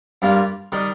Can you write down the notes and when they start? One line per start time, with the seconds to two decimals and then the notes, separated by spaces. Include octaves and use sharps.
0.22 G2 G3 A#3 F4
0.72 D#3 G3